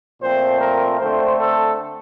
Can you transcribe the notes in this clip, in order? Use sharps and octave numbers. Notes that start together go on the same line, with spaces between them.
A#2 F3 A3 C4 C5
A#4
D3 A3 C4 C5
A4